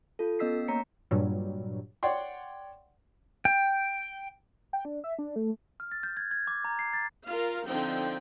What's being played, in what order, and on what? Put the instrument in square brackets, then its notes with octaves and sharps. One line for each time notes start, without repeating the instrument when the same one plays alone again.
[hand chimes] F4 A4
B3 C#4 D#5 E6 B6 C7
A#3 C#5 A#5 B6 C#7
[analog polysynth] G2 A#2 F#3 G3
[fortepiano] C#5 D5 F#5 G5 C6
[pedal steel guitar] G5
[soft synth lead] G5
D4
E5
D4
A3
[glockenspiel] F6
A6
G6
G#6
G#6
D6
A#5
C7
A6
[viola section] F4 A#4 F5
D3 F3 C4 D#4 G5